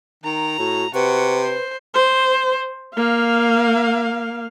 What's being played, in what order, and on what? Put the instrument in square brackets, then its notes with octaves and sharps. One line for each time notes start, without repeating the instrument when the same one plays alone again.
[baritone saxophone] D#3 [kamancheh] A#5
[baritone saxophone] A2 [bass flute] F#4
[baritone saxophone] C3 [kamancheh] F#4 [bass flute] B4
[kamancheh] C5
[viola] C5
A#3 F5